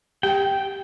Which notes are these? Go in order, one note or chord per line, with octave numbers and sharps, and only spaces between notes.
G4 G5